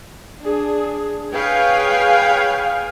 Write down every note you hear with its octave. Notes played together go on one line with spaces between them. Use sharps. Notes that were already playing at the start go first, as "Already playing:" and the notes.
D4 G#4
G#4 B4 C#5 F5 G5 G#5